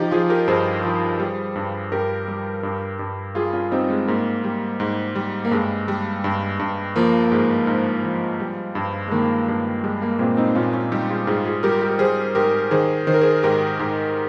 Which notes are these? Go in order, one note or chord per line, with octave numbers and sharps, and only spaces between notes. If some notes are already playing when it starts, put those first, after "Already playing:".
Already playing: F3 D#4 G4
F3 F4 G#4
G4 A#4
G2 G#4 C5
F3
G3
G2
G2 G4 A#4
G3
G2
G2
G3 F4 G#4
C#4 F4
G3 C4 D#4
G#3
G#2 A#3
G3
G#2
G3
A#3
G2 G#3
G3
G2
G2
F3 A#3
A#3
G#2 G#3
G#2
F3
G3
G2
G#3
D#3 A#3
G2
G3 G#3
A#3
A#2 G#3 C4
C4 D#4
A#2 C#4 F4
C#4 F4
G3 D#4 G4
F4 G#4
G#2 F4 G#4
F4 G#4
G3 G4 A#4
G4 A#4
G3 G#4 C5
G#2 G4 A#4
D#3 G#4 C5
D#3 C5
A#4
G#4 C5
G#2 G4 A#4
G#2